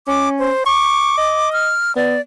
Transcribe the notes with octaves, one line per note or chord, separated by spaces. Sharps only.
C#4 D6
C5
C#6 D6
D#5
F6
B3 D5